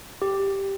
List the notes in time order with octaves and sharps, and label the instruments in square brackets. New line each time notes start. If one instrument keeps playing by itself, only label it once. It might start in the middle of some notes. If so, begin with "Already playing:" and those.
[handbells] G4